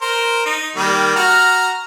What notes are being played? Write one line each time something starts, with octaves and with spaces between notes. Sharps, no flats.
A#4 C5
D#4
D#3 G3 A#3
F#4 A#5 F6